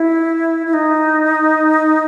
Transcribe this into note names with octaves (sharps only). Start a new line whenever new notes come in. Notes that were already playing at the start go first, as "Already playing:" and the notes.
Already playing: E4
E4
D#4